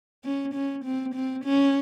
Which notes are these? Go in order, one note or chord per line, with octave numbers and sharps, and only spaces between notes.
C#4
C#4
C4
C4
C#4